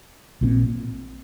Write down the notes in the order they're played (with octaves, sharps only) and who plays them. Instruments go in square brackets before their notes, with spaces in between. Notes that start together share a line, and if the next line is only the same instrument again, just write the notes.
[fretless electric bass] A#1 A#2 F3 C4